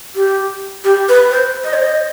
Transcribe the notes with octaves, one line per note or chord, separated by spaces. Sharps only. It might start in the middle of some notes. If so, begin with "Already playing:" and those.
G4
G4
B4
C5
D#5
C5
D#5